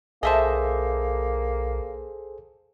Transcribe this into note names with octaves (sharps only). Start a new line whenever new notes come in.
B1 A#3 G#4 A4 C5 D#5 E5 A5